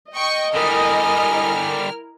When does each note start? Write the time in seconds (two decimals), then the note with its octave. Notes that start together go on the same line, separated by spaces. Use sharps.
0.15 D#5 G5 C#6
0.54 D3 G3 E4 A#4 G#5 F6